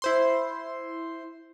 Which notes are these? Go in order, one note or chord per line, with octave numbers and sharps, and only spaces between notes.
E4 C5 C6